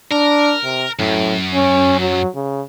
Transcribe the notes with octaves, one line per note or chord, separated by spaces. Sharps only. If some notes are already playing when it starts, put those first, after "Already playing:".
D4 A#4
C3
F#2 A2
C#4
F#3
C#3